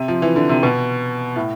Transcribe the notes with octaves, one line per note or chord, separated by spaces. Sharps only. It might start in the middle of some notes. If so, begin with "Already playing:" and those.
Already playing: C3
F3
E3
D3
C3
B2
A2